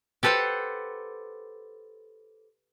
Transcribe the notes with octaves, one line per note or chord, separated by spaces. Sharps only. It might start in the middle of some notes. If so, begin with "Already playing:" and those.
G4 A4 B4 C5 F#5